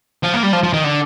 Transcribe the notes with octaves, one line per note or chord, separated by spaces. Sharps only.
F3
A#3
G3
F3
F3
D#3
D3